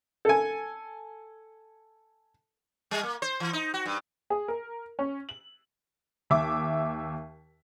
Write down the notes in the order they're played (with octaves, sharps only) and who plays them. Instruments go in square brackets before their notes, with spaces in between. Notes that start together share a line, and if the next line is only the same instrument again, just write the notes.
[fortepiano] A4 G#5
[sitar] G3
A#3
C5
E3
D#4
F#4
G2
[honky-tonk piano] G#4
A#4
C#4
F#7
D#2 E5 D6